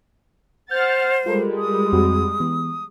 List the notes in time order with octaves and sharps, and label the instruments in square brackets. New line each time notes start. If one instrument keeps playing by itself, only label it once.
[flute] C5 [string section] F#5 F6 A6 [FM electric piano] G6
[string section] G3 G#3 [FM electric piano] F4 A4 A#4
[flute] D#6
[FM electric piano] F2 C4 F#4
E3 B3